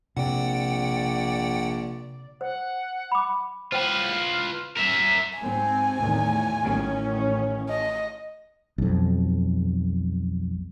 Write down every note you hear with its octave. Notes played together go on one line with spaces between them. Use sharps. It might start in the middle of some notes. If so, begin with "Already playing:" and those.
A#1 C3 D5 F#5 G5
C5 F#5
B5 D6
F4 B4 C5 F#5 G5 F6
A#4 E5 B6
G#2 C4 G#5
E2 A2 D#3
A1 D#3 C#4
D#5
B1 F2